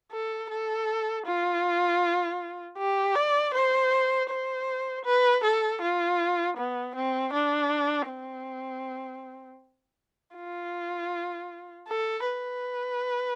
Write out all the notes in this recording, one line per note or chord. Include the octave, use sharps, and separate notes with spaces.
A4
A4
F4
G4
D5
C5
C5
B4
A4
F4
B3
C4
D4
C4
F4
A4
B4